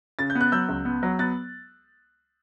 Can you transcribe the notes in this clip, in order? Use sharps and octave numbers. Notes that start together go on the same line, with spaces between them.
C#3 A6
G6
B3
F#6
F#3 E6 G6
C#2
B3
F#3
B3 F#6 A6